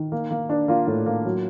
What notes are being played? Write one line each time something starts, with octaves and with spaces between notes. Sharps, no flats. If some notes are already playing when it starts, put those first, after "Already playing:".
Already playing: D#3
A#3
A#3
D4
A#3 F4
A2
A#3
F#3